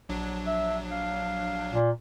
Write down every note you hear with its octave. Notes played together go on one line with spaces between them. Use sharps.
A#1 F#3 D4
E5
F5
A#2